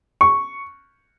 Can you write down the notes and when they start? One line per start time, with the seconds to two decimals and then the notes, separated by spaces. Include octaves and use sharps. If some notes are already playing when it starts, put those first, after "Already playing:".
0.21 C#6